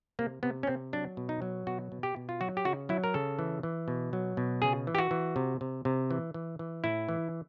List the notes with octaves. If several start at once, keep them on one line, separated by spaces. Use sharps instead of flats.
C3 A#3
C3 B3
C#4
C3 C4
F#3 D4
B2
D#4
F#3
B2 F#4
B2
G4
B2
F4
F#3 F#4
G4
C#3 F#4
F#3 E4
A#4
C#3 A4
E3
E3
B2
F#3
B2
C#3 G#4
E3
G4
F#4
E3
C3
C3
C3
E3
E3
E3
A2 E4
E3